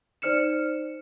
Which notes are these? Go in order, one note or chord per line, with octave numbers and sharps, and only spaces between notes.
D#4 C5 D5 F6 C#7 E7